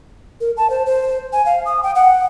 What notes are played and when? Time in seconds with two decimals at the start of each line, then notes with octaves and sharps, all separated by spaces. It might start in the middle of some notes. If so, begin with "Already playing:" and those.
0.40 A#4
0.57 A5
0.70 C5
0.86 C5
1.33 G#5
1.46 F5
1.66 D#6
1.83 G5
1.95 F#5